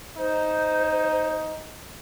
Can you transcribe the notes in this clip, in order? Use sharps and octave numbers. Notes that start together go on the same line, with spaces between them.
D#4 C5